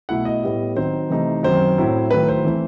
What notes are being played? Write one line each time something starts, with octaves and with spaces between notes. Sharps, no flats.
B2 A3 E4 F#5
D#5
A2 G3 B3 E4
D#3 F#3 C4 D#4 C5
C3 E3 A3 D#4
F#2 D#3 F#3 C4 C5
A2 F#3 C4 E4
D#3 F#3 A3 E4 B4
C5
E3 A3 C4 E4